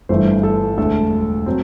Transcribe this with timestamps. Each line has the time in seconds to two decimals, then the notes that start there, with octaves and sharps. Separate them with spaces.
0.09 G1 G2 E3 A3 C5
0.43 A4
0.78 E1 D2 D3 A3 A4
1.46 F#3 C4